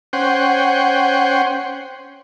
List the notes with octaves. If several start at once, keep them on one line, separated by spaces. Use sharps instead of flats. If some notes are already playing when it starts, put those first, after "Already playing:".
C#4 C5 F#5 G5